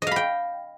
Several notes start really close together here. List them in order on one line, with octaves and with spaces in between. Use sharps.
D#5 F5 B5 G5